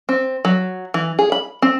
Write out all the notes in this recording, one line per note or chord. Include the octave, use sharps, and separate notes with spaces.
C4
F#3
E3
G#4
B5
C4